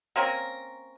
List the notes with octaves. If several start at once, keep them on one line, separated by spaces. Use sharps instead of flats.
A#3 C4 C#4 A#4